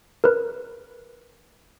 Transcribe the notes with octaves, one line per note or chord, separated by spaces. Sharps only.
A#4 B4